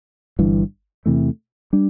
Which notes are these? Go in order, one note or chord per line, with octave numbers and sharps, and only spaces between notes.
G1 G2 E3
E2 C3 E3 A3
G3 D4